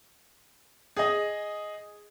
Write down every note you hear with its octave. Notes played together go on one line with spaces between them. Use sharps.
G#4 D#5